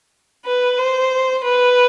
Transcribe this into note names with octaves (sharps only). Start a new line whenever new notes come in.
B4
C5
B4